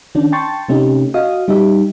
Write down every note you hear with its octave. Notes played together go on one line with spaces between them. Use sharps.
D#3 C#4 D4
G5 A5 C6 C#6 A6
C3 A3 C#4 D#4 G4
F#4 D#5 F5 D#6
G3 D#4 G4 E5